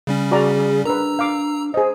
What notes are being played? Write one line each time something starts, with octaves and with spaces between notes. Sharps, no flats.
C#3 G3 C#4
F#4 G#4 D5 A#5
D4 A#4 B4 A#5 E6
F5 D6
G#4 C5 D#5